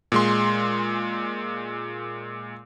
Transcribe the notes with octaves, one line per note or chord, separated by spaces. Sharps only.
A#2 G#3 C6